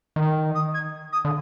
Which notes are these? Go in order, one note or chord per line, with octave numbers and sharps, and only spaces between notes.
D#3
D#6
G#6
D#6
D3